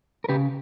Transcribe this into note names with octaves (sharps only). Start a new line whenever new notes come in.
A#4
C#3 G4 B4